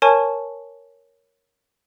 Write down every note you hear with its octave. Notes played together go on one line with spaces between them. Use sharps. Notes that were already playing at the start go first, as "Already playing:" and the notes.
A#4 C#5 G#5 A5 C#6